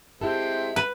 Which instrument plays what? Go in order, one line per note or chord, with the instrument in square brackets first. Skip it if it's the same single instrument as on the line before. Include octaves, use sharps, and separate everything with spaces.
[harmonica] G#3 C4 [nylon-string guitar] E4 G4 A4 [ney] E5
[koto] B4